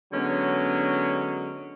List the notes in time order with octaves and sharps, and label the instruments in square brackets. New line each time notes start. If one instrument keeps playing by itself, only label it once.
[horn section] D3 F#3 G#3 B3 C#4